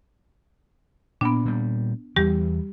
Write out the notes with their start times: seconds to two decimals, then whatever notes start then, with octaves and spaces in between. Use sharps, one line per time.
1.21 A#2 B3 D4
1.45 A#2 G3
2.16 E2 E3 G3 G4